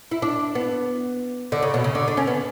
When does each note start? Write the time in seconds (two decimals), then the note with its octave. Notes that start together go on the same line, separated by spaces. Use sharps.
0.11 E4
0.22 D4
0.55 B3
1.52 D3
1.63 C#3
1.74 B2
1.84 C#3
1.95 D3
2.08 D4
2.17 C#4
2.27 B3